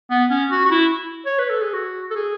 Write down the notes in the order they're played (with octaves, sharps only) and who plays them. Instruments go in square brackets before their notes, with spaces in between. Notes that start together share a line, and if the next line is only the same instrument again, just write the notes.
[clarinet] B3
C#4
F#4
F#4
E4
C#5
B4
A4
G#4
F#4
A4
G#4